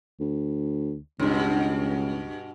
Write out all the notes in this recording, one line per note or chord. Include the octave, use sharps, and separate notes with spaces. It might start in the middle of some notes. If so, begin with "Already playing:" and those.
D2
C#2 G2 B2